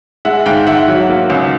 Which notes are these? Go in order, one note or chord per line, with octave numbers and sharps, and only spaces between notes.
G#3 E5 F#5
G#2 F5 G5
G#2 E5 F#5
F#3
A#3
C#2